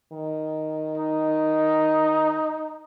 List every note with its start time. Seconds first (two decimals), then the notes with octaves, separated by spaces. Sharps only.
0.13 D#3
0.98 D#4